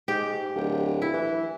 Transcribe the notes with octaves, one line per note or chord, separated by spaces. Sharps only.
G#2 G4
D1
E4
E3